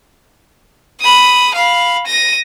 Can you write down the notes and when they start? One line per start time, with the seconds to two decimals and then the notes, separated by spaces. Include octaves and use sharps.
1.01 B5 D#6
1.55 F5 B5
2.07 A#6 D#7